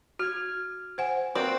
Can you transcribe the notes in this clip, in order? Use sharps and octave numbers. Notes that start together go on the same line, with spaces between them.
F#4 F6 G#6
C5 F#5 G#5
A#3 C4 F#4 B4 D5